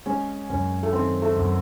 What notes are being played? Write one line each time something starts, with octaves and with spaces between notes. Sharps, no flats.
G#3 C#4
F#2 C#4
A3
D#3 C4
A3
F#2